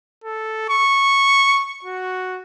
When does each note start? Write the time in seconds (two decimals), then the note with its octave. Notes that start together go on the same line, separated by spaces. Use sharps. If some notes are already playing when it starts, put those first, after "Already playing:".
0.24 A4
0.69 C#6
1.84 F#4